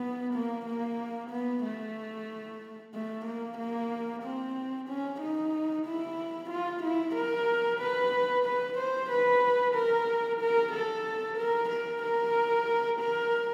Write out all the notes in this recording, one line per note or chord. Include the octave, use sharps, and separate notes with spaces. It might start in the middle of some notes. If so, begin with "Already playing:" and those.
Already playing: B3
A#3
A#3
B3
A3
A3
A#3
A#3
C4
C#4
D#4
E4
F4
E4
A#4
B4
B4
C5
B4
A#4
A#4
A4
A#4
A#4
A#4
A#4